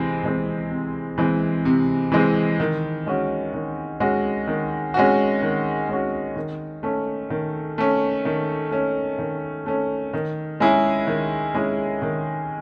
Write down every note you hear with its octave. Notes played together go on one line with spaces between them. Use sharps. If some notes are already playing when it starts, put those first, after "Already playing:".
Already playing: C3 E3 G#3 C4
E3 G#3 C4
C3
E3 G#3 C4
C3
E3 G#3 C4
D#3
G#3 C#4 F#4
D#3
G#3 C#4 F#4
D#3
G#3 C#4 F#4
D#3
G#3 C#4 F#4
D#3
A3 C#4
D#3
A3 C#4
D#3
A3 C#4
D#3
A3 C#4
D#3
G#3 C#4 E4 G#4
D#3
G#3 C#4 E4 G#4
D#3